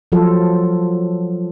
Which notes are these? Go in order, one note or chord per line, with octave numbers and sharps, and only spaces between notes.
F3 F#3 F4 A4